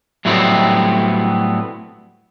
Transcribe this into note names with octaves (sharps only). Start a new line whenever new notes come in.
A2 F#3 G3 A3 B3 C4